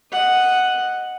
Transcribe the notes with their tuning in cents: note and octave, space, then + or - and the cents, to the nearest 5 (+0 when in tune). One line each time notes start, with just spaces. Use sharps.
D#5 -5 F#5 +0